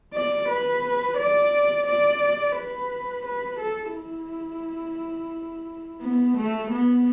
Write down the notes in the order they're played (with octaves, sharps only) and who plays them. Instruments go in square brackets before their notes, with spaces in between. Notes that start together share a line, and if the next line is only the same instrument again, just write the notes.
[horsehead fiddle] D5
B4
D5
D5
B4
B4
A4
E4
B3
A3
B3